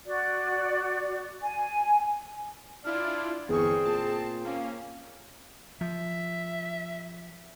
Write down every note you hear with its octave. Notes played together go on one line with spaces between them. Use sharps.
F#4 D5
G#5
D4 E4 F4 D5 F6
G1 E2 C4 G#4 C#6
A#2 A5
A#3 C#4 F5
F3 E5